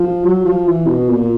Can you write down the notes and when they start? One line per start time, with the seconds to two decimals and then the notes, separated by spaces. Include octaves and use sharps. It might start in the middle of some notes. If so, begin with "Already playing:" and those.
Already playing: F3
0.24 F#3
0.45 F3
0.67 E3
0.87 B2
1.09 A#2